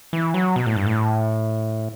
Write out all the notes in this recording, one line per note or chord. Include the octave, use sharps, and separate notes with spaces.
E3
F#3
B2
A2
G2
A2